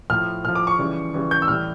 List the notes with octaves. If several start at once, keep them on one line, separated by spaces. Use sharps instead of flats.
A2 F3 F6
A2 F3 F6
D6
C#6
C#3 E3 G3
C#3 E3 G3
G6
E6
A2 E3 G3 F6